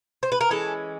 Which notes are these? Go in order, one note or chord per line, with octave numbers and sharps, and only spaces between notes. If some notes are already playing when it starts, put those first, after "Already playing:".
C5
B4
A#4
E3 G#3 C#4 A4